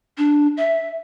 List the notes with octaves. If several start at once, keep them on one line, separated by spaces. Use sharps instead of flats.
D4
E5